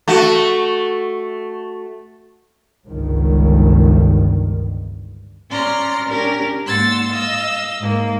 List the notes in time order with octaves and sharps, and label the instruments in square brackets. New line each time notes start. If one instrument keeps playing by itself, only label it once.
[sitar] A3 F#4
[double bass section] G1 C#2 G2 D#3
[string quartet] C#4 D5 A#5 C6 F6
C#4 D4 G4 A#4
G#2 A#3 F#5 C6 E6 A6
D#5 F5 E6
G#2 A#3